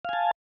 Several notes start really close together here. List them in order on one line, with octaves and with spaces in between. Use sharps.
F5 G#5 A5